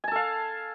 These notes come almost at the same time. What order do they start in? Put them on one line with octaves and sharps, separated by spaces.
G#5 A5 A4 F5